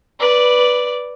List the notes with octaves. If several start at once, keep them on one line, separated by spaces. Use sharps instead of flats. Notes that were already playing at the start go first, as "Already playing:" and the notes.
B4 D5